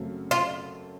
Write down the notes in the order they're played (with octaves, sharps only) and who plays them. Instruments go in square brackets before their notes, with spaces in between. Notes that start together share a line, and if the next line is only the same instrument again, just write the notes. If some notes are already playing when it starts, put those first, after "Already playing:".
Already playing: [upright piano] F#2 C#3 A3 C4 F#4
[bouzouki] F4